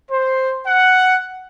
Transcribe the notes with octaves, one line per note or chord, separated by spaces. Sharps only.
C5
F#5